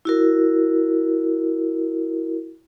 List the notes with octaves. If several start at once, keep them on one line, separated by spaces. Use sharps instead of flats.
E4 F#4 A#4